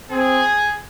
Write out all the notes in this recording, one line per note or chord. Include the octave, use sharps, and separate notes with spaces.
C4 G#4